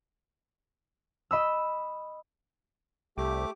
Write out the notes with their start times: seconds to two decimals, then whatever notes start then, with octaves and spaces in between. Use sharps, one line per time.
1.31 D#5 B5 E6
3.18 C2 A3 G4 D6